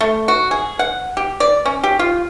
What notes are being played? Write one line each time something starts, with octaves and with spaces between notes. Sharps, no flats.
A3
F#4
G#4
F#5
G4
D5
C#4
G4
F4